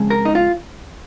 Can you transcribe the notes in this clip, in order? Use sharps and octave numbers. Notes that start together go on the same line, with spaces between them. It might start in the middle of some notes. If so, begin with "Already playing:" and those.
Already playing: F2 C#3 G#3
A#4
D#4
F4